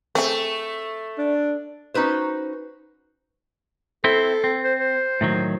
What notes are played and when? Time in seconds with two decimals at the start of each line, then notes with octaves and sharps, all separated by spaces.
0.15 A3 C4 G#4
1.18 D4
1.94 C#4 D#4 F#4 B4 C5
4.04 C4 E4 A4 C5
4.44 C4
4.64 C5
4.80 C5
5.21 A2 D#3 F#3